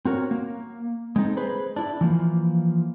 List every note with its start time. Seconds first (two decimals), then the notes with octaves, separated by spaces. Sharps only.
0.05 C4 F#4 A#4 C#5
0.31 A#3
1.16 G#3 C4 D#4 A4
1.37 G#4 B4 C5
1.76 D4 E4
2.01 E3 F3 A#3